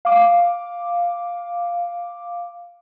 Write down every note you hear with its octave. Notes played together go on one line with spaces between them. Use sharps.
F5 D6